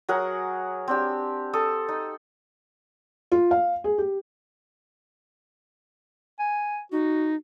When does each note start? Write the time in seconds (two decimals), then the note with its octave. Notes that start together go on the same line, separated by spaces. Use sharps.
0.09 F#3 G#4 A#4 F#5
0.88 C4 D4 G4
1.53 A4 D#6
1.89 D#4
3.32 F4
3.51 F5
3.84 G#4
3.98 G4
6.39 G#5
6.92 D#4 F#4